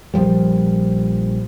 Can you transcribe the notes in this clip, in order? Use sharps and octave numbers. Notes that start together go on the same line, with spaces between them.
A#1 F3 G3